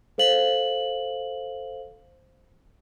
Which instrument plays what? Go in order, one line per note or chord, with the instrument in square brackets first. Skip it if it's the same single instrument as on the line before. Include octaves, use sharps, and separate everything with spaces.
[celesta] A4 C5 F5 F#7